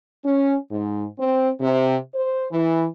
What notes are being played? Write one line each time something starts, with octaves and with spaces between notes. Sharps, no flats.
C#4
G#2
C4
C3
C5
E3